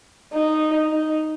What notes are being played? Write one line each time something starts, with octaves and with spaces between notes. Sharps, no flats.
D#4
D#4